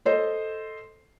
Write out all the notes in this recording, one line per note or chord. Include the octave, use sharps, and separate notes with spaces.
A4 C5 D#5